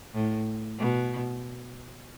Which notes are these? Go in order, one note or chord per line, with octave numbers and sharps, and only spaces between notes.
A2
B2